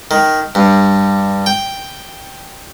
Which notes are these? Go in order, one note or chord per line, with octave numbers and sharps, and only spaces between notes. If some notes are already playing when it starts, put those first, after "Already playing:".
D#3
G2
G5